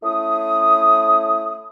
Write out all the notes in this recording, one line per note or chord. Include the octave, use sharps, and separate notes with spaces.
A3 C#4 E4 D#6